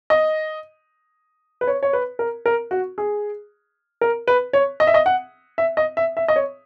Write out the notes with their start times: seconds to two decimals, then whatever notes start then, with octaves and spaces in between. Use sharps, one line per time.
0.10 D#5
1.61 B4
1.67 C#5
1.83 C#5
1.93 B4
2.19 A#4
2.46 A#4
2.71 F#4
2.98 G#4
4.01 A#4
4.27 B4
4.53 C#5
4.80 D#5
4.87 E5
4.94 D#5
5.06 F#5
5.58 E5
5.77 D#5
5.97 E5
6.17 E5
6.28 D#5
6.36 C#5